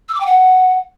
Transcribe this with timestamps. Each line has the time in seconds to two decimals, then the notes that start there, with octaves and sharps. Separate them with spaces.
0.09 E6
0.15 D6
0.20 G5
0.26 F#5